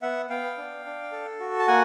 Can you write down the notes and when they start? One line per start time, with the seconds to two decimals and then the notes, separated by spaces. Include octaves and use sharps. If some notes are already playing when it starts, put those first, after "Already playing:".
0.02 B3 E5 F#5
0.30 B3 F5 G5
0.57 D4
0.86 D4
1.12 A4
1.40 F#4
1.59 A5
1.68 A#3 F#5 G#5